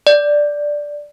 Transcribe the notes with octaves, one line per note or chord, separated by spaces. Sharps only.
D5